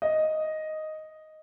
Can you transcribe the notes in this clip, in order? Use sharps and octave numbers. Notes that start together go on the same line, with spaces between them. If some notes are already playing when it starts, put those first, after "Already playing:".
D#5